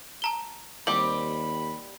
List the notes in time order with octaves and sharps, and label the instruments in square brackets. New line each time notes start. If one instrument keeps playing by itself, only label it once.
[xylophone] A5 A#5 G7
[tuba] D#2 [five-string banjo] G3 C4 G4 [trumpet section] B5 [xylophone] F#7